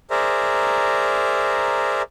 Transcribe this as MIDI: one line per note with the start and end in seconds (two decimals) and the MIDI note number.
0.11 2.02 68
0.11 2.02 70
0.11 2.02 72
0.11 2.02 74
0.11 2.02 76
0.11 2.02 82